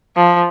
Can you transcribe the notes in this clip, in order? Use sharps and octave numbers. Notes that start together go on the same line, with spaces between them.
F3